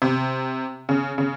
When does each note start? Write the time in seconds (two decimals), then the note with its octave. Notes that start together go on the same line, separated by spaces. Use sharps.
0.02 C3
0.89 C#3
1.18 C#3